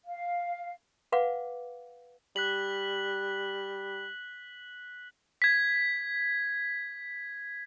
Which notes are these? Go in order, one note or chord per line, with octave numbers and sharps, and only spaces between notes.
F5
B4 F5 F#5 D6
G3 F#6 B6 F#7
G#6 B6